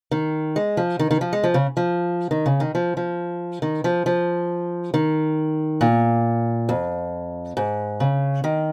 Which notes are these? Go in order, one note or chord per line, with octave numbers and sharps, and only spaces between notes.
D#3
G#3
F3
D#3
D#3
F3
G#3
F3
C#3
F3
D#3
C#3
D#3
F3
F3
D#3
F3
F3
D#3
A#2
F2
G#2
C#3
D#3